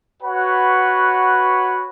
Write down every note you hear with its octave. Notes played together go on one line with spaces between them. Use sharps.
F#4 B4 C#5 F#5 B5